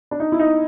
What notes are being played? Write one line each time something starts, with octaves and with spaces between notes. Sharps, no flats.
D4
D#4
E4
D#4